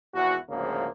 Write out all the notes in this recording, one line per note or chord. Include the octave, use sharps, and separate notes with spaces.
G#1 E2 E4 F#4
G#1 D2 G#2 C#3 F3 A#3